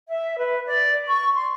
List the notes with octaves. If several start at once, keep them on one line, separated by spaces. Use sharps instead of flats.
E5
B4
D5
C#6
C6